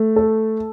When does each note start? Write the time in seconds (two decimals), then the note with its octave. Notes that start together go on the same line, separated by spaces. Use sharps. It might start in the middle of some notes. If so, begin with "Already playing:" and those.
Already playing: A3
0.16 A4